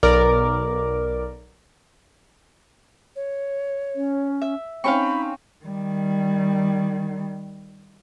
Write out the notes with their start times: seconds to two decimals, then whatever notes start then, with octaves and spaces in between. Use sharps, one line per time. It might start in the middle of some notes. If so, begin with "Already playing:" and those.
0.03 B1 A#4 D5 D6
3.15 C#5
3.96 C#4
4.42 E5
4.84 C4 C#4 D#4 F5 G5 B5 C#6
5.66 D#3 G3